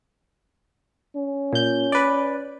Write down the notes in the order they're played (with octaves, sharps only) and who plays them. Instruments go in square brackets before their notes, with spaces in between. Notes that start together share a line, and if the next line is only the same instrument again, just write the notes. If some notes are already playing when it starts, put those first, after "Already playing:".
[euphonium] C#4
[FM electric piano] A#2 G6
B4 D5